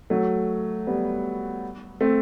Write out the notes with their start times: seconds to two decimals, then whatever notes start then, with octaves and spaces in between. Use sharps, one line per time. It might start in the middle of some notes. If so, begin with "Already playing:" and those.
0.10 F#3 A3
0.87 G3 B3
2.01 A3 C4